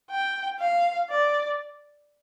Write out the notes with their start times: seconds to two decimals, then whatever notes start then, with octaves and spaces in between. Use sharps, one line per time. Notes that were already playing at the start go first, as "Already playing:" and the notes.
0.11 G5
0.60 F5
1.10 D5